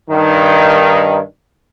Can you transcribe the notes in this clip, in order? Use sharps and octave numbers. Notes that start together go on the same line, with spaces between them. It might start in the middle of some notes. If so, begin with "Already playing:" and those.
G2 D#3